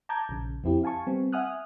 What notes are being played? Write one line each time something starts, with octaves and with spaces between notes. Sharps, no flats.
A5 A#5 D6 G6 G#6
A#1 C#3
F2 C4 E4 G4
F5 G#5 A5 C#6
G3 B3 C4
E5 F#5 G#5 D#6 F6 F#6